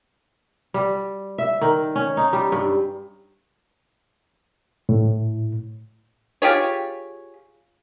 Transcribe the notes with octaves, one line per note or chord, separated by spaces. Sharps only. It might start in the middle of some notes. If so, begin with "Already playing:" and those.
G3
E5
D#3
C#4
D#4
G3
G2
A2
F4 G4 G#4 C#5